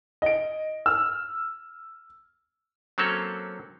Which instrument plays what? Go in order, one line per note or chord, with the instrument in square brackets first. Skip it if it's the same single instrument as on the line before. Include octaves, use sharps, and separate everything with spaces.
[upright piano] D#5 D7
E6 F6
[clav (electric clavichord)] F#3 A#3 C4 C#4 A4 C#5